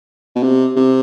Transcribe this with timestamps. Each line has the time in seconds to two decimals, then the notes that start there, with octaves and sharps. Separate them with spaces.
0.36 B2
0.43 C3
0.76 C3